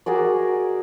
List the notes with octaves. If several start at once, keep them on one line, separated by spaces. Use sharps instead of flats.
F#4 G#4 A#4 D5